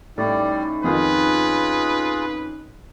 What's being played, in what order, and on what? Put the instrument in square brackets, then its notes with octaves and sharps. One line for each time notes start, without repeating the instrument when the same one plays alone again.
[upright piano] A2 [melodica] G3 D5 [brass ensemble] C#4 D#4
[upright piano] F2 D#3 F3 [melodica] F4 G#4 [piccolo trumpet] B4